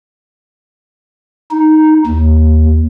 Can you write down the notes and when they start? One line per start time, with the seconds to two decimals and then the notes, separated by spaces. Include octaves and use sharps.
1.51 D#4
2.07 D#2